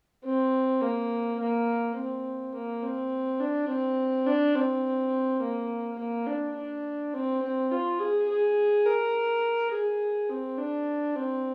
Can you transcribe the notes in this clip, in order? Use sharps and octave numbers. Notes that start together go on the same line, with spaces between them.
C4
A#3
A#3
C4
A#3
C4
D4
C4
D4
C4
A#3
A#3
D4
D4
C4
C4
F4
G#4
G#4
A#4
G#4
C4
D4
C4